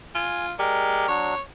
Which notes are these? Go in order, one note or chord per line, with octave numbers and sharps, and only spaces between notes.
F4 G#5
G#3 G4 A#4 D5
F#3 D4 C#5